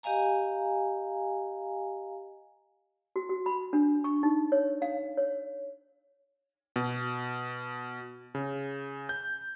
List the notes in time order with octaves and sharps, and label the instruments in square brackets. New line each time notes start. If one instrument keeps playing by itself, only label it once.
[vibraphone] G4 D#5 F5 G#5 A#5
[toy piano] F#4
F#4
B5
D4
C#6
D#4
C#5
F5
C#5
[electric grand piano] B2
C#3
G6